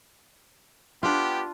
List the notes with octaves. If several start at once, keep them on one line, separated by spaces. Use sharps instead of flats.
B3 D4 F4 G4